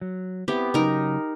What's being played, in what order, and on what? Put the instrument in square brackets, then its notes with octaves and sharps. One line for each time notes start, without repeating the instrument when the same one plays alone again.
[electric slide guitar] F#3
[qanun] B3 G4 [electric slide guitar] C4 E4
[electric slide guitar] C#3 F#3 [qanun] D#4 A#4